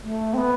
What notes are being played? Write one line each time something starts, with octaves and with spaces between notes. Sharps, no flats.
A3
C4
B3